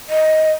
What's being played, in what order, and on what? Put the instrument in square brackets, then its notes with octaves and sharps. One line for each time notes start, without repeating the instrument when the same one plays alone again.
[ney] D#5